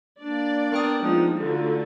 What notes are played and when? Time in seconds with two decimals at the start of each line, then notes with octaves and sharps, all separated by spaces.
0.20 A#3 D4 D5
0.72 B3 A#4 G5 D#6
1.01 F3 G#3 A#3 D#4
1.37 D3 A3 D#4 F4 F#4